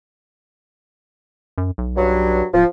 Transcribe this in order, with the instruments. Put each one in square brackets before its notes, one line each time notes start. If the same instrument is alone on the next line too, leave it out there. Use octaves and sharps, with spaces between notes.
[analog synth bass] F#2
B1
[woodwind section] G2 F#3
[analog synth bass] D1 [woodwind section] F3